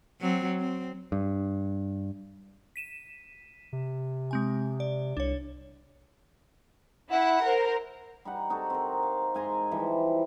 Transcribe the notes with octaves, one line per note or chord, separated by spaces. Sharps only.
F#3 C4
C4
G2
B6 D#7 E7
C3
G#3 C4 G#5
D5
C2 D4 C#5
E4 F#5
A#4 C5
G3 D#4 F#5
C4 D#4 F#4 A4
C4 A#4
F5
G#2 G#5 A#5 C6
E3 F3 G3